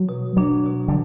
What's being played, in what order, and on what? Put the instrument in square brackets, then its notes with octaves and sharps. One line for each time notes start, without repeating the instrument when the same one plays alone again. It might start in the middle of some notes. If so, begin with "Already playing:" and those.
Already playing: [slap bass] F#3
[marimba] B2
[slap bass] F#3 [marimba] D4
[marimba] B2
[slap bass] D3